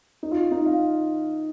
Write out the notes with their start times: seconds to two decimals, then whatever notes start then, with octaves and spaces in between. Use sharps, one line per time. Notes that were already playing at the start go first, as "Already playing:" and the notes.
0.23 D#4
0.32 F4
0.52 D#4
0.66 F5